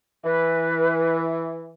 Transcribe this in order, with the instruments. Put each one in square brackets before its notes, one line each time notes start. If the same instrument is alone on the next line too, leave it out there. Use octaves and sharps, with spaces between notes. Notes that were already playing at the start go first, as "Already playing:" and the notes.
[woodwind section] E3 [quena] B4